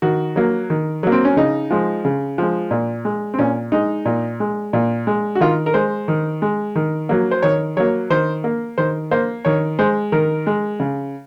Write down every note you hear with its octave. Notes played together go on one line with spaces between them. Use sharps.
D#3 F#4
F#3 A#3
D#3
F#3 A#3
C4
C#4
C#3 D#4
F3 G#3
C#3
F3 G#3
A#2
G#3
C4
A#2 C#4
G#3 D#4
A#2
G#3
A#2
G#3
F#4
D#3 F4
A#4
G#3 C5
D#3
G#3
D#3
F#3 A#3
C5
D#3 C#5
F#3 A#3 C#5
D#3 C5
A#3
D#3 C5
A#3 C5
D#3 C#5
G#3 C5
D#3 A#4
G#3
C#3